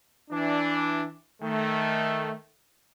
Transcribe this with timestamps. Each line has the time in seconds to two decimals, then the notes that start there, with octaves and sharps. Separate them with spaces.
0.31 E3 D4
1.42 D#3 A3